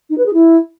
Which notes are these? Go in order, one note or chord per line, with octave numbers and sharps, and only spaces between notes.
D#4
B4
G#4
E4